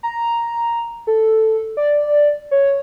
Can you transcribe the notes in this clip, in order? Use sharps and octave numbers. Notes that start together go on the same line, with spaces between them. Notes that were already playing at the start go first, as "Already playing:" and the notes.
A#5
A4
D5
C#5